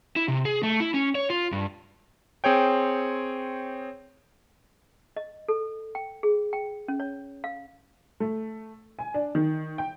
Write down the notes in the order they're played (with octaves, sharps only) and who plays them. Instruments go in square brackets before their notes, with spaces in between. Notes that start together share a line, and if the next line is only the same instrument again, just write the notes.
[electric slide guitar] E4
C3
G#4
A3
E4
C#4
C#5
F4
G2
[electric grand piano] C4 G#4 C#5 G5
[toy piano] D#5
A4
G5
G#4
G5
C#4
C#5
F5
[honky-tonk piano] A3
G#5
D4
D#3
G5